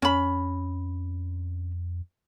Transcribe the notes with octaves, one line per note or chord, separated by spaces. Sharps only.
F2 C#4 B5